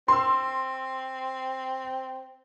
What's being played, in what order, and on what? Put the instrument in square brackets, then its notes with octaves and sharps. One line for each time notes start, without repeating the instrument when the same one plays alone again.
[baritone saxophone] C4 [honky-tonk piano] C6 E6